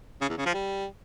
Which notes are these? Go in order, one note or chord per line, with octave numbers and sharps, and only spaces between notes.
C#3
E2
C#3
F3
G3